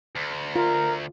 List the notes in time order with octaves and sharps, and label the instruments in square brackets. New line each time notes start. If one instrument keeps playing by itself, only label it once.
[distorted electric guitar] D2
[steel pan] F4 [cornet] A#4